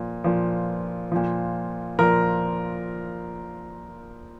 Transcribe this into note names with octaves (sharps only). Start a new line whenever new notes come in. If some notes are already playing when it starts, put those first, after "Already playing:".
Already playing: A#2 F3
A#2 F3
A#2 F3
A#2 F3 A#4